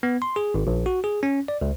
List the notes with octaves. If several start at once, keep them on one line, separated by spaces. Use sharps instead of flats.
B3
C6
G#4
G#1
A#1
F#4
G#4
C#4
D5
C#2